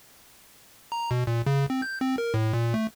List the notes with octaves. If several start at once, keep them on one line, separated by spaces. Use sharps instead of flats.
A#5
B2
A#2
C#3
C4
G6
C4
A#4
A2
A#2
A3